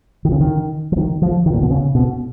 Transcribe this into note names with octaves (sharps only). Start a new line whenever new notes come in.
D#3
C#3
D#3
F3
D#3
F3
D#3
A#2
B2
C#3
B2